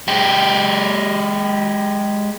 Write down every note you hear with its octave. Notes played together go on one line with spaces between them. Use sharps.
G#3 G4